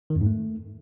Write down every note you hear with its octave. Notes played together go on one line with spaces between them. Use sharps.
D#3
F2
G#2
A3